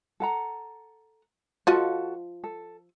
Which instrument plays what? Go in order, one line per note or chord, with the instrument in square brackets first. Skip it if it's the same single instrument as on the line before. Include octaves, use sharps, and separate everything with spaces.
[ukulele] A4 F#5 A#5
[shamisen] F3 F4 D#5 [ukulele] F#4 A4
[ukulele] A4